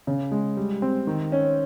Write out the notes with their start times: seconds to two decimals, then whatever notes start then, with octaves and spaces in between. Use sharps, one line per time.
0.07 C#3
0.32 G#3
0.57 G3
0.82 C4
1.07 D#3
1.32 C#4